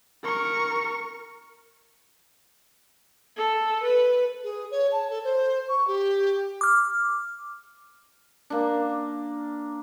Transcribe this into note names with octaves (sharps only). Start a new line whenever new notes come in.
A#4 C#6
A4
B4
G#4
C#5
A5
A4
C5
C#6
G4
D6 F6
A#3 D4